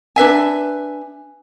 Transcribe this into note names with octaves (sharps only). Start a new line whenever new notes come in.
D4 B4 E5 G#5